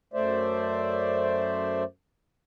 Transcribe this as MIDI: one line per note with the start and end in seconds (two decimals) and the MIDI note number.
0.14 1.84 42
0.14 1.84 57
0.14 1.84 72
0.14 1.84 74
0.14 1.84 76